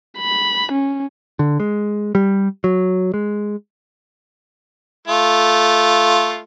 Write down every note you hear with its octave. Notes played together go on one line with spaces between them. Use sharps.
B5
C#4
D3
G#3
G3
F#3
G#3
A3 F4